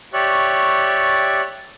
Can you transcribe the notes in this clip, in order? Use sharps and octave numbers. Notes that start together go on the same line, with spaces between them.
G4 C#5 D5 E5 C#6 F#6